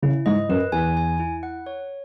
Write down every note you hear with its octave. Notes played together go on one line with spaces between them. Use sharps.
C#3 E4
G#2 D#5
F#2 B4
E2 G#5
G#5
E4
F#5
C#5